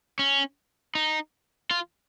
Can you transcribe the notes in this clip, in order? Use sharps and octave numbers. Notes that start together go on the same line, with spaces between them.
C#4
D#4
F4